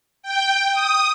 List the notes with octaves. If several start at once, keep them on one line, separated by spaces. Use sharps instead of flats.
G5
D#6